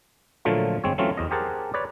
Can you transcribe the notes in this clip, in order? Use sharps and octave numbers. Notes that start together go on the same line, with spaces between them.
A#2 D3 F3 F#3 A3 F4
G1 G#3 C4 C#5
E3 F#3 A3 C4 C#4 F4
E2 D#5
G4 G#4 A#4 C5 F#5 A5
B4 C#5 D5